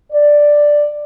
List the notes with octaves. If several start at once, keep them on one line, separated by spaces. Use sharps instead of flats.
D5